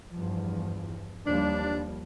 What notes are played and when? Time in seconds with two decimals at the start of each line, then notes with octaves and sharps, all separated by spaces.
0.13 E2 G2 F3
1.26 D#2 F3 G3 D4